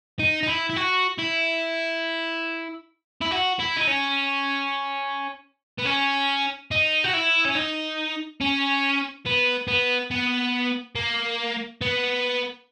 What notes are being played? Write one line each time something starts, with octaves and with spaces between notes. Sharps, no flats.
D#4
D#4
E4
E4
F#4
E4
E4
F#4
E4
D#4
C#4
B3
C#4
D#4
F#4
E4
C#4
D#4
C#4
B3
B3
B3
A#3
B3